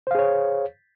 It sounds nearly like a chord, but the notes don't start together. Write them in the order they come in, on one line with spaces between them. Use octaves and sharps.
C5 F5 G#4 C#5